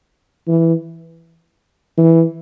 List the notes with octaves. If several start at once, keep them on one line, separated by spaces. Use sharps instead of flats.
E3
E3